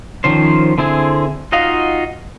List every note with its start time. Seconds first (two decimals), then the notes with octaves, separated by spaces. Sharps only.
0.24 D#3 F3 C#4 C5
0.78 D3 C4 E4 G#4
1.52 D#4 F4 F#4 D#5 F5